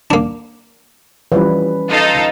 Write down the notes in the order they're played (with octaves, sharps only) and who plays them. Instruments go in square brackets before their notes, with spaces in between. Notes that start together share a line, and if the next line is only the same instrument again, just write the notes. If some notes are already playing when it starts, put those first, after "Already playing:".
[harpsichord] A#3 D4
[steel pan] E3 F3 G3 [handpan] C#4 B4
[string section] D#4 F4 A4